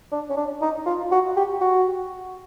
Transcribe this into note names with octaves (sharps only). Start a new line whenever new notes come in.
D4
C#4
D4
D#4
F4
F#4
G4
F#4